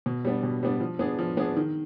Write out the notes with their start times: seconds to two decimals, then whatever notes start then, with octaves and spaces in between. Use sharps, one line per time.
0.06 B2
0.25 G3 B3 D4
0.43 B2
0.63 G3 B3 D4
0.81 F3
0.99 B3 D4 G#4
1.19 F3
1.37 B3 D4 G#4
1.57 D#3